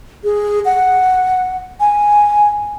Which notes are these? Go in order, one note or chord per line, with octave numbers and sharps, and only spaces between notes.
G#4
F#5
G#5